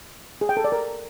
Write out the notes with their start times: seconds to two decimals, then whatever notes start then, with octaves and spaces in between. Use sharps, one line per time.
0.41 G#4
0.49 G5
0.57 A4
0.64 D5
0.72 A#4